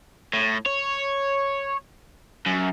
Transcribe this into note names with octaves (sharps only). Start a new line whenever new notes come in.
A2
C#5
F#2